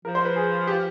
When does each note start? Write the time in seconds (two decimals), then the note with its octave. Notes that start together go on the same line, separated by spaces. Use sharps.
0.05 F3 A#4
0.15 C5
0.25 B4
0.36 G#4
0.67 G4